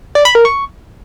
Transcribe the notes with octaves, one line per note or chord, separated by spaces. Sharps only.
D5
B5
A#4
C#6